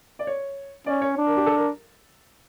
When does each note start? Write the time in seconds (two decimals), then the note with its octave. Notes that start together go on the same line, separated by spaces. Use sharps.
0.19 D5
0.27 C#5
0.86 C#4 D5
1.02 C#5
1.17 D4
1.26 A#4
1.37 G4
1.46 A4
1.56 A#4